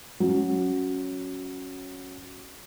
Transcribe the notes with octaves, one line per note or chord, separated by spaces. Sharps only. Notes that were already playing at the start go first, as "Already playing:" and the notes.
F#3 C#4